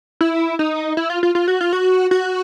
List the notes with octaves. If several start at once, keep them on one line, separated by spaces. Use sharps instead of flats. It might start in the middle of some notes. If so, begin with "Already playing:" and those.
E4
D#4
E4
F4
F4
F4
F#4
F4
F#4
F#4